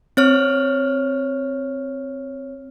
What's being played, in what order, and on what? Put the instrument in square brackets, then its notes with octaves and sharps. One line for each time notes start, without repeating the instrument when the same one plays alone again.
[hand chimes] C4 C#5 F6